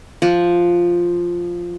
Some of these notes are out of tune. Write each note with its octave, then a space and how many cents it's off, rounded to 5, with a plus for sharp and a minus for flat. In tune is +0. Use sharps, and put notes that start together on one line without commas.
F3 +0 F#5 +0